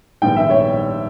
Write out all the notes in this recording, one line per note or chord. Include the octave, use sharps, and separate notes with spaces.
A#1 G#2 D#3 G3 B3 G5
E5
C#5